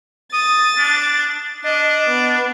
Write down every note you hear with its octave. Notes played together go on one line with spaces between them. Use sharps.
D#6 A6
D4
D4 D#5
B3